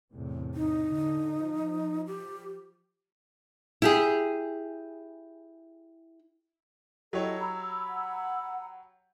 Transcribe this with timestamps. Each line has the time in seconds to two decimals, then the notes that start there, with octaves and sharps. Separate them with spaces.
0.12 E2 A2 C3
0.55 D#4
0.89 D3
1.43 F3
2.07 G4
3.82 E4 G4 G#4
7.13 F#3 E4 G4 A4 C#5 D#5
7.40 A#5 B5 E6
7.89 F#5